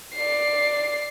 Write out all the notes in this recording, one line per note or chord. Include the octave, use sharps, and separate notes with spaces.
D5 C7